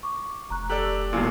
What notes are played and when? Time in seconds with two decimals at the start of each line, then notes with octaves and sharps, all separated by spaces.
0.03 C#6 D6
0.50 F1 A#5 C#6 F#6
0.70 G4 A4 D5 E6 F#6 F#7
1.13 E1 B1 A#2 F#3 E4 F4 G#5